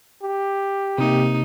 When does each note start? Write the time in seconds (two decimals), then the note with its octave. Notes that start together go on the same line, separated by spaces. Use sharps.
0.23 G4
0.98 C3 A#3 D#4